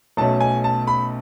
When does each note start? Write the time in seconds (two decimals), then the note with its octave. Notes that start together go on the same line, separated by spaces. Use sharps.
0.17 B1 B2 A3 C#4 A5
0.40 G#5
0.64 A5
0.87 B5